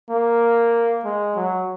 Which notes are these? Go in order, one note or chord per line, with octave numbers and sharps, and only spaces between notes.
A#3
G#3
F#3